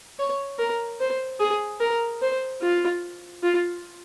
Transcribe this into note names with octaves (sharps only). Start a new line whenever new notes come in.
C#5
A#4
C5
G#4
A#4
C5
F4
F4